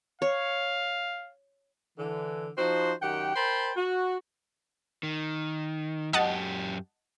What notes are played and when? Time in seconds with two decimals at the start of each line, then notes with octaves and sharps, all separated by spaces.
0.22 C#5 F5
1.98 D3 E3
2.58 F3 D#4 F#4 C5
3.02 F#2 D#3 G4 F#5 G5
3.36 A#4 C5 G5 A5 B5 C6
3.77 F#4
5.03 D#3
6.13 F#2 G4 D#5 F#5 A5